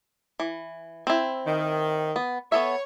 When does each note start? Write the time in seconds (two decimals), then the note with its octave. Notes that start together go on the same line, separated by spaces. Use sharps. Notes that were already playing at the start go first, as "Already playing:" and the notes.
0.40 E3
1.07 C4 E4
1.47 D#3
2.16 B3
2.52 B3 A4 C#5 E5